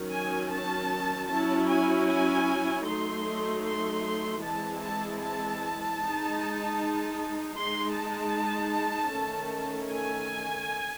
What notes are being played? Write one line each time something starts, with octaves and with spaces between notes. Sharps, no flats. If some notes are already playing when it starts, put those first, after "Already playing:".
Already playing: D#3 F#3 C#4
G#5
A5
F#3 C#4 E4 A5
G#5
G#5
F#3 A3 D#4 C6
C6
E3 G#3 C4 E4 A5
A5
A5
G#3 D#4
G#3 D#4 C6
A5
D#3 A3 C#4
G#5